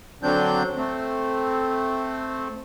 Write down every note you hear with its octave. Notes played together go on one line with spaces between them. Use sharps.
D3 F#3 C4 D4 G6
A3 C4